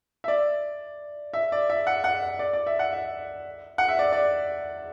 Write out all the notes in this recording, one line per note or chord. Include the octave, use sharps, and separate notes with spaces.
E5
D5
E5
D5
E5
F#5
F#5
D5
D5
E5
F#5
E5
F#5
E5
D5
D5